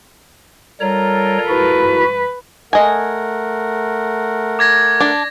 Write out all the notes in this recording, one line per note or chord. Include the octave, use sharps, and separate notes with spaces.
G3 F4 A4 A#4 C#5 A#5
E4 F#4 B4
A3 A#4 D#5 F#5 G#5
D6 G#6 A#6
D4